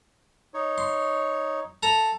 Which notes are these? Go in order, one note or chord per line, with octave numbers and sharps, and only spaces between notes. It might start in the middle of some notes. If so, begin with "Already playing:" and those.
D#4 C#5
C6
A4 A#5